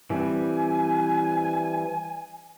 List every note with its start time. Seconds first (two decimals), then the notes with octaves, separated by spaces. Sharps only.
0.10 E3 G3 C4 G#5